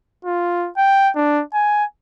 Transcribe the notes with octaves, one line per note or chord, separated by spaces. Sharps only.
F4
G5
D4
G#5